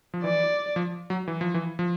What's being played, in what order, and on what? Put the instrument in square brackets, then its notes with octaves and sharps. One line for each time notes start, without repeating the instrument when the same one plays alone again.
[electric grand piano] F3
[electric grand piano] E3 [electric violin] D5
[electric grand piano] F3
F#3
E3
F3
E3
F3